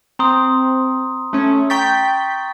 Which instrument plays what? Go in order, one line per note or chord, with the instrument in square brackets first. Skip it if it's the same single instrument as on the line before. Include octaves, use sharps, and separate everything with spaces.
[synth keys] C4 [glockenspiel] A#5 C6 D#6
[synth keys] A3 C#4
[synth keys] G5 G6 B6 [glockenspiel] A#5 C#6 A6